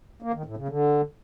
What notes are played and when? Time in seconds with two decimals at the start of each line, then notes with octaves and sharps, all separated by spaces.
0.22 A#3
0.34 D#3
0.45 A2
0.57 C#3
0.68 D3